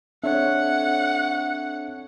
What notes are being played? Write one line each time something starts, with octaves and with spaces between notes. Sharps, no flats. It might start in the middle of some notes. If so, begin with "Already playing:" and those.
C4 D4 A4 C#5 E5 F#5